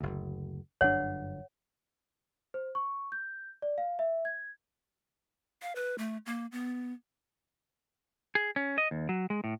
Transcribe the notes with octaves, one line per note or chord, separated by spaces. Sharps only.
F#1 D2
G1 F#2 D4 C#5 F#5
C5
C#6
G6
D5
F5
E5
G#6
F5
B4
A3
A#3
B3
G#4
C#4
D#5
D#2
F#3
G#3
A2